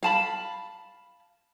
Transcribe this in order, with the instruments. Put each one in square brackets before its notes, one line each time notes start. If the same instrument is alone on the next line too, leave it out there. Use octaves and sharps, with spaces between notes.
[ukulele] F5 A5 B5